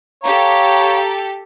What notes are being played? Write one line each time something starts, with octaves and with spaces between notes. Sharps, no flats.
G4 A4 C#5 F5 A#5